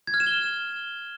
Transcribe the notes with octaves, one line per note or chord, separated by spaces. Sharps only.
G#6
F6
E7
G7